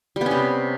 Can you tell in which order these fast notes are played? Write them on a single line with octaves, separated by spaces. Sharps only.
G3 B3 C#4 C3